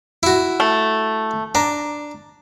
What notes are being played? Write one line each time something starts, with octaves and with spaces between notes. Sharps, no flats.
E4 F#4
A3
D4 A#5